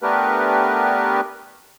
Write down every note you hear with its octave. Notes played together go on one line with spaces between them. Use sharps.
A3 B3 D4 G4 A#4 B4